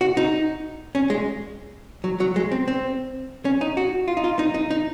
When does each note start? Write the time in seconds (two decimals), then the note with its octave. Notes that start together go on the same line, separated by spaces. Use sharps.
0.01 F#4
0.17 D#4
0.95 C#4
1.10 G#3
2.04 F#3
2.20 F#3
2.36 G#3
2.51 C4
2.68 C4
3.45 C#4
3.61 D#4
3.77 F#4
4.08 F4
4.17 D#4
4.24 F4
4.39 D#4
4.55 D#4
4.71 D#4